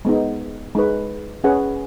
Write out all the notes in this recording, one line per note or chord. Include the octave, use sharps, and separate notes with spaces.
G#3 B3 D#4
G#3 D#4 B4
C#4 G#4 B4 F#5